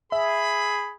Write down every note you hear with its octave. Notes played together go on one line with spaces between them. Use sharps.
G#4 E5 B5